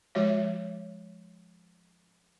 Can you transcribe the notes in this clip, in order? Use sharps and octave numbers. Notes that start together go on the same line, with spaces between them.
F3 G#3 F#4 C#5 E5